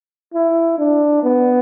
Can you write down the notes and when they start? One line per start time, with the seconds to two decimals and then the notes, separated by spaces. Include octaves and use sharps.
0.34 E4
0.78 D4
1.23 B3